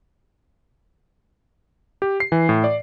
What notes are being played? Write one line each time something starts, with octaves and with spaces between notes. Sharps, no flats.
G4
C7
E3
A2
D5